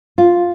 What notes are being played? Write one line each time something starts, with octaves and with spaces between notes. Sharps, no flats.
F4